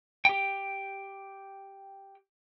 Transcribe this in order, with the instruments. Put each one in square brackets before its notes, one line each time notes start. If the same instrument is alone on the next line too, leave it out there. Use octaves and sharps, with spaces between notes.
[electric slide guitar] G4 G5